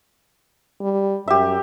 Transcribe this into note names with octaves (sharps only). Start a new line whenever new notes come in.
G3
F#2 G4 E5